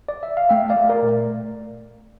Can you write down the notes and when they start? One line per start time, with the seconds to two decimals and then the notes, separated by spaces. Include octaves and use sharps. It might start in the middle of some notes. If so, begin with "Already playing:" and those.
0.09 D5
0.23 E5
0.37 F5
0.49 A3 E5 G5
0.70 D5 F5
0.76 A3
0.89 A#4 D5
1.03 A#2